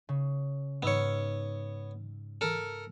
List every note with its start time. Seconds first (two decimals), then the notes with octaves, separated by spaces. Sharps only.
0.09 C#3
0.83 G#2 B3 C#5 E6 F6
2.41 A4 A#4